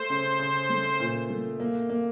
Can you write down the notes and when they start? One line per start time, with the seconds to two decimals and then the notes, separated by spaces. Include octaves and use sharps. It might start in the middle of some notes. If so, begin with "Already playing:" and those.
Already playing: A3 C5
0.10 C#3
0.39 C#3
0.70 A3
1.00 A#2
1.30 A3
1.60 A#3
1.90 A#3